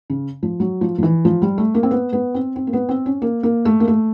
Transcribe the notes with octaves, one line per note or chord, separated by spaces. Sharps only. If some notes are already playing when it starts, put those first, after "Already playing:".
C#3
F3
F#3
F3
F3
E3
F3
G3
A3
A#3
C4
B3
B3
C4
C4
A#3
B3
C4
C#4
A#3
A#3
A3
A#3
A3